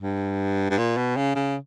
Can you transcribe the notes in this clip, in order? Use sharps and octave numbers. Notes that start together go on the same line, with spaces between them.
G2
G2
A#2
B2
C#3
C#3